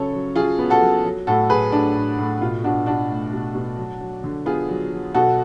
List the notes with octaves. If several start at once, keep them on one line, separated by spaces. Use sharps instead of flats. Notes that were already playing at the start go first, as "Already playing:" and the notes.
Already playing: C#3 F#3 A4 C#5
F#3
F#3 F4 G#4
B3
F#4 A4
F#3
F#3
A2 F#4 A4
F#3 G#4 B4
A2 D4
A2
A2
B2 F4
B2 D4 F#4
B2 D4 F#4
A3
B2
B2
F#3
F#3
D3
B3 F4 G#4
F#3
F#3
B2 F#4 A4